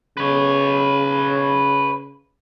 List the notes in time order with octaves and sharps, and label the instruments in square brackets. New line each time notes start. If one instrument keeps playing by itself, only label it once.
[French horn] C#3 [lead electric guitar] B4 C#5